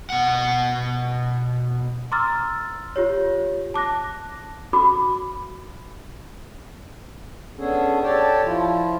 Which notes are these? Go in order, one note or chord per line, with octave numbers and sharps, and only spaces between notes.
B2 F#5
A#5 C6 D6 E6 F6 A6
F4 G4 C#5
A5 D6 F#6 A#6
F#4 B5 D6
B3 C#4 D4 G#4 A4
G4 A4 C#5 D5 G5 A5
F3 E4 F4